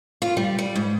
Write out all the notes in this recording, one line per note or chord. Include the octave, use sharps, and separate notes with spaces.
F4
G3
G3
G#2